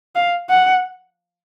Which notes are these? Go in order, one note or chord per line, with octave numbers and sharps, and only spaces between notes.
F5
F#5